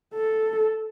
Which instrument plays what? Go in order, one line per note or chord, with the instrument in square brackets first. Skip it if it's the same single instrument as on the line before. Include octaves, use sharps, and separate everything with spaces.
[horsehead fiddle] A4